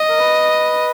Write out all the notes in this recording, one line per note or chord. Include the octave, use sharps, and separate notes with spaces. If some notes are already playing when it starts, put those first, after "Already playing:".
Already playing: D#5
A#4
B4